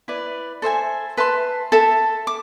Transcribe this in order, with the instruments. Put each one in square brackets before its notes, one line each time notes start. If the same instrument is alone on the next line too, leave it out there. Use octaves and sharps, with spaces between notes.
[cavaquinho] E4 B4 D5
A4 C5 E5 G#5
B4 E5 A5 C6
A4 E5 A5
D6